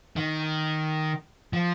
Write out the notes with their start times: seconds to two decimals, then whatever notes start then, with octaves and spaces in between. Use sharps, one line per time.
0.17 D#3
1.53 F3